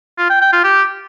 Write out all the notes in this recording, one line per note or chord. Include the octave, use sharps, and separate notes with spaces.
F4
G5
G5
F4
G4